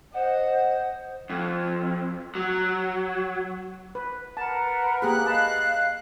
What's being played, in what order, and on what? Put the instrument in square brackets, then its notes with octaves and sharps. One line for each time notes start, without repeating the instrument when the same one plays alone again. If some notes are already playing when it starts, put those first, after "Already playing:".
[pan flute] C5 [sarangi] D#5 [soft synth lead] F#5
[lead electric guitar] F2
F#3
[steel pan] B4
[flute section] A#4 B4 F#5 [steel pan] A5
[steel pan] A#3 G4 G#4 [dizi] F#6
[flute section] D#5 F5 [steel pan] A5 B5